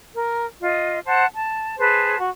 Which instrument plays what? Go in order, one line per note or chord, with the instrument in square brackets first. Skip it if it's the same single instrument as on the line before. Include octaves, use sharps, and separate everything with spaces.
[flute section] A#4
F4 D#5
C5 F#5 A5
A5
G#4 B4 C5 A5
F#4